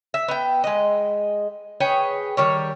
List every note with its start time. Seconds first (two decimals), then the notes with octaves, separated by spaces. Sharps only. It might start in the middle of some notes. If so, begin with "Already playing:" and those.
0.14 E5
0.28 B3 G5
0.64 G#3 D#5
1.80 G#4 B4 C#5 G5
2.37 D#3 G3 C#5